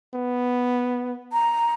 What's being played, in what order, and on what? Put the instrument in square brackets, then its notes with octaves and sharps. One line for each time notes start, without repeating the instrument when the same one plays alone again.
[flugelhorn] B3
[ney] A#5